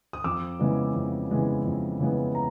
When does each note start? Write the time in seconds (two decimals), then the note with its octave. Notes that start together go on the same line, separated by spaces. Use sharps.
0.13 D#6
0.24 F2 D6 E6
0.59 C#3 E3 G#3 B3
0.95 F2
1.30 C#3 E3 G#3 B3
1.65 F2
2.00 C#3 E3 G#3 B3
2.35 A#5